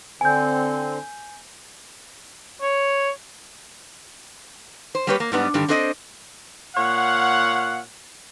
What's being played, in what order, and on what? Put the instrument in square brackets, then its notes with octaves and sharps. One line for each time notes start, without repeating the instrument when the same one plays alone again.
[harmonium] D3 C4 [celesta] G#5 G6
[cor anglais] C#5
[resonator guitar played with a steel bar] C5
G3 A#3 G4 B4 C#5
A#3
G#2 G3 B3 D4
G2 D3 D#3 G4
C4 D4 A4 C5 D#5
[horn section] A#2 C#5 F5 F#5